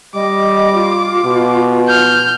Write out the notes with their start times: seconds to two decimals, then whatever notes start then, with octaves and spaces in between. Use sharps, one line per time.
0.15 G3 D#5 D6
0.75 F4
1.25 B2
1.87 F6 G6